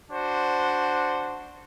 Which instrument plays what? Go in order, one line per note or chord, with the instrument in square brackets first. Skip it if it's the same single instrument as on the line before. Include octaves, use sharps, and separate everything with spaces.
[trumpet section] D4 F#4 C5